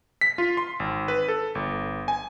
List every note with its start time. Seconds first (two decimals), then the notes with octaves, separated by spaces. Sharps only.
0.21 B6
0.38 F4
0.57 C6
0.80 G#1
1.08 B4
1.28 A4
1.55 G1
2.08 G#5